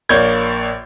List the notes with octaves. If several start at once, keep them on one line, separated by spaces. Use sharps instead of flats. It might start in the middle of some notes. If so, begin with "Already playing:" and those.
A#1 A#3 C#5 D5 G6 G#6